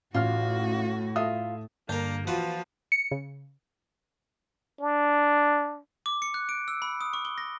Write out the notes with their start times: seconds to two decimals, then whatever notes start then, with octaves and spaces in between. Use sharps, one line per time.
0.14 A1 A2 F4 F#4 F6
1.16 F4 A4 E5 D#6
1.89 G2 D3 A#3 D4 A#4 G6
2.27 E3 F3 F4 F#4 B4
2.92 C#7
3.11 C#3
4.80 D4
6.06 D6
6.22 C#7
6.34 F#6
6.49 D7
6.68 E6
6.82 B5
7.01 D#6
7.13 C#6
7.25 G7
7.38 A#6